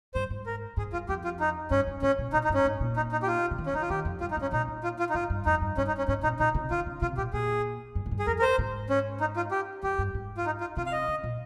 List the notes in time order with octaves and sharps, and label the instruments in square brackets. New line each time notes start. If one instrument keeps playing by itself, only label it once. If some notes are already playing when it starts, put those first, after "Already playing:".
[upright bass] G2 [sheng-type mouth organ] C5
[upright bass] G#2
[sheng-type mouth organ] A#4
[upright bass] G#2 [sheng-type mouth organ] G#4
[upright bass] G2 [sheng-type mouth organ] F4
[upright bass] F2 [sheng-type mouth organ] G4
[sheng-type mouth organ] F4
D#4
[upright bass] G2 [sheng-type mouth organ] C#4
[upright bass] G2
[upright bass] G#2 [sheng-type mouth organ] C#4
[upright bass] A#2
[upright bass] A#2 [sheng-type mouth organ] D#4
[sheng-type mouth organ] D#4
[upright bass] G2 [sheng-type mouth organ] C#4
[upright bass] G#2
A#2
[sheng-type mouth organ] D#4
D#4
G4
F4
[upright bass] C#3
D#3
[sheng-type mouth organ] C#4
[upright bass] D#3 [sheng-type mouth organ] D#4
[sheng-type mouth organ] F4
[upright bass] D#3 [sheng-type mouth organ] G4
[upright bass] F2
[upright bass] G2 [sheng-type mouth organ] F4
[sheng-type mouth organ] D#4
[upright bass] G2 [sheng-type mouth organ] C#4
[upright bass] A#2 [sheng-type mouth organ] D#4
[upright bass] A#2
[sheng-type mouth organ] F4
F4
D#4
[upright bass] G#2 [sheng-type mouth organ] F4
[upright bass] G2
[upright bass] F2 [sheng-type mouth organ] D#4
[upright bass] G2
[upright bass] G2 [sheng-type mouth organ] C#4
[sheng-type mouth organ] D#4
C#4
[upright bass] G#2 [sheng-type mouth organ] C#4
[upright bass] A#2 [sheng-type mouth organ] D#4
[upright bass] A#2 [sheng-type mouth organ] D#4
[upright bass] C3
[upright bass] C#3 [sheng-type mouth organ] F4
[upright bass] C#3
[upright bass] C3 [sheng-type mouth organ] F4
[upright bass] A#2 [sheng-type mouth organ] G4
[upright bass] A#2 [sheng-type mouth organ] G#4
[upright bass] G2
G#2
G2
[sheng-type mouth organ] G#4
[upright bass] F2 [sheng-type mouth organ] A#4
[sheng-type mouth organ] A#4
C5
[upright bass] G#2
[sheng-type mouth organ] C#4
D#4
F4
G4
[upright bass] F2 [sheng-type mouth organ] G4
[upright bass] G2
G#2
[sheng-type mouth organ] F4
D#4
F4
[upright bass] C3 [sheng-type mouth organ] F4
[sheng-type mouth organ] F5
D#5
[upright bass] C#3
A#2